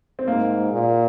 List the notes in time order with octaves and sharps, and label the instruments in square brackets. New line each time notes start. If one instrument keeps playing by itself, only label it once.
[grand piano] C4
[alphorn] G#2 [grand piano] A#3
[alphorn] A#2